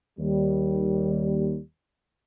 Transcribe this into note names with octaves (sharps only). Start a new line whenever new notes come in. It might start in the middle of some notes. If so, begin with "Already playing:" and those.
D#2 G3